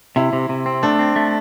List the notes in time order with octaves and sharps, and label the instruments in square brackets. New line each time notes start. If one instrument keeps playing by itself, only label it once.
[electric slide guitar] C3 [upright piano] E4
[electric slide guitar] C3
C3
C4
[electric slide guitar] A3 [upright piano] D4
[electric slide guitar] C4
A3